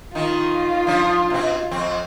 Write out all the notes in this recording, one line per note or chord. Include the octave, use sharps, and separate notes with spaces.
D#3 D#4 F4
F3 D4
B2 C4
F2 C4